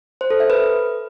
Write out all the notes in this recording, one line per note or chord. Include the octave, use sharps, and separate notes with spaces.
C5
A4
E5
B4